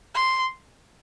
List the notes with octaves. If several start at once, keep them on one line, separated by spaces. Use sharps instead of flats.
C6